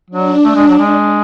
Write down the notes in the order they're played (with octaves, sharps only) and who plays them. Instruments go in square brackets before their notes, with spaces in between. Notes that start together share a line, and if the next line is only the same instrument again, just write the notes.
[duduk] F#3 [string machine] D4
[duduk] A3
G#3
F#3
G#3